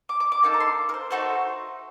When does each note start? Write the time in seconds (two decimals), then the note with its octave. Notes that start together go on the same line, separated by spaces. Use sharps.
0.09 D6
0.20 D6
0.32 D6
0.43 A#3 D#4 A4 D6
0.54 A#5
0.60 C6
0.89 A#4
0.94 C5
1.11 A3 D#4 F#4 A4 C5